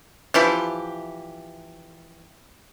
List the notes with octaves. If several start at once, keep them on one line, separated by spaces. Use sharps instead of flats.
E3 F3 E4 G4